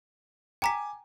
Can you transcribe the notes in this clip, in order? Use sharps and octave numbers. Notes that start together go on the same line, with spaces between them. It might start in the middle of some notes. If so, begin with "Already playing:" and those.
G5 G#5 A#5 D6 B6